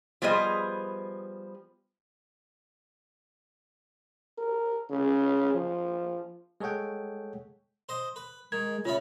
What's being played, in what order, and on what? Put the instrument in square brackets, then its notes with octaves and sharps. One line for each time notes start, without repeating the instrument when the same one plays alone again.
[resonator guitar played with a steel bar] F3 G3 B3 G#4 C5 D#5
[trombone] A#4
C#3
F3
[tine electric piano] G#3 G#4 A4 C#5 F#5 G5
[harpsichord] C5 D#5
B4
[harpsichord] D#3 [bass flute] G#3 [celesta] G#6
[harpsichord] C#3 C#4 B5 [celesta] F4 E5 [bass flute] C#5